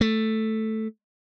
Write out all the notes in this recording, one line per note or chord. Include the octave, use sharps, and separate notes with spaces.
A3